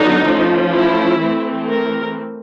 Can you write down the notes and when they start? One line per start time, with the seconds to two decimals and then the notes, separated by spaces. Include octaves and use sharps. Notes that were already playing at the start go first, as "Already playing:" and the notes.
Already playing: D3 F#3 B3 D4 D#4
0.26 F3 A3 C#4
0.74 E4
1.20 E3 A3 C4
1.69 A#4